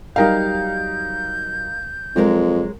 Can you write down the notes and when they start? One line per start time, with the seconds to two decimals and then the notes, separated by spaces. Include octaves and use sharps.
0.16 F#3 G3 D#4 G4 A#4 F5 G6
2.16 F2 F#3 G#3 A#4